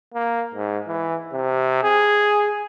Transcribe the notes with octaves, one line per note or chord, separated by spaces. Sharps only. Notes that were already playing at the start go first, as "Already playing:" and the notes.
A#3
G#2
E3
C3
G#4